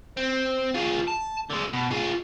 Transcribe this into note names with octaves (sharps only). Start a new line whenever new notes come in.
C4
F4 G#4
A5
D3 G#3
B2
F4 G#4